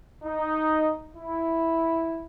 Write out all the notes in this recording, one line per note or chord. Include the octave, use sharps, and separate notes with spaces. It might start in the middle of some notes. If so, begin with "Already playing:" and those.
D#4
E4